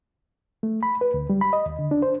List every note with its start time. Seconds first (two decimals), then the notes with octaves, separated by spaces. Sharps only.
0.63 A3
0.83 B5
1.01 B4
1.14 D2
1.30 G3
1.41 B5
1.53 D#5
1.66 D#2
1.79 D3
1.91 D4
2.02 C5